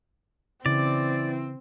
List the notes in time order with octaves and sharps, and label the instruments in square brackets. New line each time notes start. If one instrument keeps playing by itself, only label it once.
[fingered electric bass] C#3 [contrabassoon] E3 [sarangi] C4 [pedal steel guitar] D5